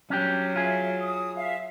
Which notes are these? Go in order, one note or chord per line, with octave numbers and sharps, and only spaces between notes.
F#3 C#4 D4 G4
F4 G#4 E5
D#6
E5 F5